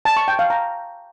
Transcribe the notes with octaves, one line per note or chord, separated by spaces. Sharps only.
A5
C#6
G5
F5
A#5